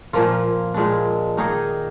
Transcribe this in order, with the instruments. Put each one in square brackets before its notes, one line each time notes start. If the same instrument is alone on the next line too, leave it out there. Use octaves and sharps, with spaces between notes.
[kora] A#2 F3 A#3 F4
A#2 G#3 D4
D#3 A#3 D#4 G#4